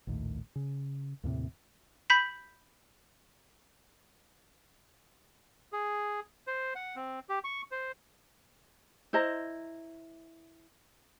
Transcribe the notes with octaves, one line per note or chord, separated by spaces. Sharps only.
A#1 D#2 A2
C#3
D#2 A2 C3
B5 G6 B6
G#4
C5
F#5
C4
G4
C#6
C5
E4 C5 D#5 A#5